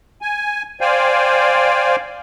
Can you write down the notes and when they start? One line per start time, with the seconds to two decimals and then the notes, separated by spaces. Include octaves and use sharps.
0.22 G#5
0.81 C5 D5 F5 G5 G#5